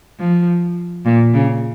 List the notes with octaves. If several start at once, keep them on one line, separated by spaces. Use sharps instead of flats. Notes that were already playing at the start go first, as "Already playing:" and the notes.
F3
A#2
C#3